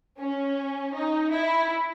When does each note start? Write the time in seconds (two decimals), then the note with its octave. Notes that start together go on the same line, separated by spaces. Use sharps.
0.19 C#4
0.95 D#4
1.32 E4